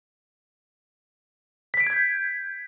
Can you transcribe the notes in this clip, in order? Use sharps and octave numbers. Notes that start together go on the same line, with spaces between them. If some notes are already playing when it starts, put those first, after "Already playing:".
B6
D7
G#6
G6